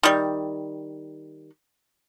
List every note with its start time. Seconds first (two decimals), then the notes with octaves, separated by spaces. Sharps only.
0.03 D#3 G3